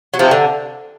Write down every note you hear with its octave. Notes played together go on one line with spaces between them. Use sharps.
F#3
C3 F3
D3